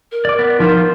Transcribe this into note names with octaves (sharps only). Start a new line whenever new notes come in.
A#4
D5 D6
B3
F3 D#4 F4 C5